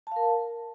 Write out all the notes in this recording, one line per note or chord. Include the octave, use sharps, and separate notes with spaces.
A#4 F5 A5